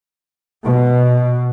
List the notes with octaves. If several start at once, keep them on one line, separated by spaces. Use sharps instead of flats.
B2